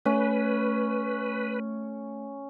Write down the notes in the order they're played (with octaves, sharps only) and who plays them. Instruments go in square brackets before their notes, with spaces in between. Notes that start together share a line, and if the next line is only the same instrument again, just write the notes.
[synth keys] A3 [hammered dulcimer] C#4 [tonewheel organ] B4